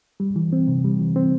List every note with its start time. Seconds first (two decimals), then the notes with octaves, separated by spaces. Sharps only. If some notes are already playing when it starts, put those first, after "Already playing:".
0.20 G3
0.36 E3
0.53 C4
0.68 C3
0.85 G3
1.00 E3
1.16 C4